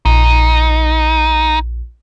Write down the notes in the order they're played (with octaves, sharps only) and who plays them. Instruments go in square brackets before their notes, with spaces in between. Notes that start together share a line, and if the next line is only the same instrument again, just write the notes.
[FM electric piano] A#1 [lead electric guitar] D#4